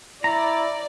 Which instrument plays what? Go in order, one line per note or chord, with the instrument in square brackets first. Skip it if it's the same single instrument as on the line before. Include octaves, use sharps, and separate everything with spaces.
[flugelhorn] E4 [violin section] D5 [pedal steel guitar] A#5